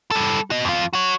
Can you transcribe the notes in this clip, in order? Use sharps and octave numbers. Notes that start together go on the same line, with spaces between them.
G3 A4
F#4 D#5
F2 F4
F#4 C#5